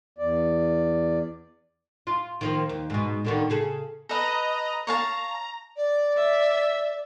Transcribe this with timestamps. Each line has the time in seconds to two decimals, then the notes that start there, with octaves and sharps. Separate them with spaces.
0.18 E2 D5
2.07 F4
2.41 D#3 F3 A#3
2.69 D#2
2.90 G#2 B2
3.25 B2 D3 D#3
3.50 C#3 G#4 A4
4.09 A4 B4 D#5 A#5
4.87 C#5 F5 A5 A#5
5.76 D5
6.17 E5